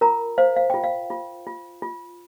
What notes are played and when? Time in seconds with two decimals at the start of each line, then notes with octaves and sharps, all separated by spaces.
0.01 F4 A#4 A#5
0.38 C5 F5
0.56 F5
0.70 F4 G5
0.84 F5
1.10 F4
1.47 F4
1.82 F4